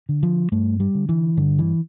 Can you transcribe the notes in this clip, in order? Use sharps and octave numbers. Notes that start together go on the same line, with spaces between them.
D3
F3
G2 A3
G3
D3
E3
G2 D3
E3